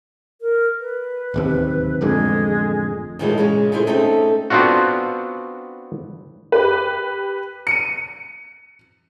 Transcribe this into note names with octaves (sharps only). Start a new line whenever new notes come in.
A#4
B4
D1 D#2 C3
A1 F2 D3 G#3
A#2 D#3 E3 F#3 G#3 A3
A#2 C#3 G#3
A#2 A3 E4 G#4 C5
A3 C4 C#4 D#4
B3 C4 D4 F4 F#4
G4 B4
C#7 D#7